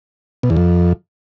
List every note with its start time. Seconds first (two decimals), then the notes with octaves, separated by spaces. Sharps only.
0.43 B2
0.50 E2
0.57 F2